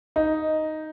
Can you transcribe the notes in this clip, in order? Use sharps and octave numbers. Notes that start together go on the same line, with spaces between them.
D#4